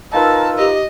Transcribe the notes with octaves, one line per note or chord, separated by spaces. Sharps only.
D#4 F4 A#4 B4 A5 E6
G4 D#5